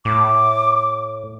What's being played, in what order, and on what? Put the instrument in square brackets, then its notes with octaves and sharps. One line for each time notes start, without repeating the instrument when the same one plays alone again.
[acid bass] A2 [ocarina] D6